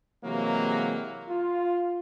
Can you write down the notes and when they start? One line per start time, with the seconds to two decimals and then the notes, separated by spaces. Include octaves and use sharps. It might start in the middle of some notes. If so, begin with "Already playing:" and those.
0.23 C3 E3 F#3 G#3 A#3
1.28 F4